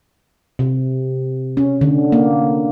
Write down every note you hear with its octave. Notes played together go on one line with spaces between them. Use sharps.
C3
C#4
D3
A#3